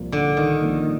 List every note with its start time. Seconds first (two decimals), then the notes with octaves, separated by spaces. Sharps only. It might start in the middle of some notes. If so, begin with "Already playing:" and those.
Already playing: C2 A#2 F3 A#3
0.12 D3
0.37 D#3
0.61 C2 A#2 F3 A#3